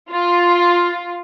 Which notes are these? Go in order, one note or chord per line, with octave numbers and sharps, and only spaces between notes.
F4